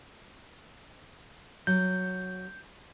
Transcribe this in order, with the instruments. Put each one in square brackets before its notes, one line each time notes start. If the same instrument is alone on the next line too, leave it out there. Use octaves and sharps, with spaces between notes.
[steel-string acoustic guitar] F#3 [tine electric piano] G6